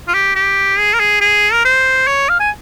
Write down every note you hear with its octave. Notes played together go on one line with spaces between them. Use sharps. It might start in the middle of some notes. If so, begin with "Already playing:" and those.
F4
G4
G4
G#4
A#4
G#4
G#4
A#4
C5
C#5
F5
G#5